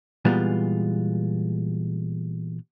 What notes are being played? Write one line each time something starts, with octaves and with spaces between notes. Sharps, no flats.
A#2 E3 G3 G#3 B3 F4